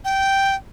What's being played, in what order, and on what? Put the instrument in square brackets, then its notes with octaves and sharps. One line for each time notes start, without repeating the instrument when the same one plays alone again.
[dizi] G5